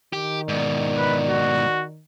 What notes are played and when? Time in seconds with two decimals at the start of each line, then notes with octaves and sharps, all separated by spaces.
0.13 D#3 G4
0.49 G#2 B2 D5
0.98 B4
1.29 F#4